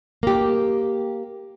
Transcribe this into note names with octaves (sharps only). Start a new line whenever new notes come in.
A#3 G4